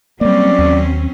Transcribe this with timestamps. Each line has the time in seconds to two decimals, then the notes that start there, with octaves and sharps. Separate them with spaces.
0.21 F#3 G3 A#3 C4 C#4 D5
0.59 D#2